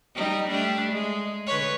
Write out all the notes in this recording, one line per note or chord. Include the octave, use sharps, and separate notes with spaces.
G3 D#4
G3 A3 D4
G#3
D3 B4 C#5